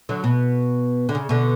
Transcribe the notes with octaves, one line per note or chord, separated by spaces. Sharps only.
D3 F#3
B2
D3
C#3
B2 D3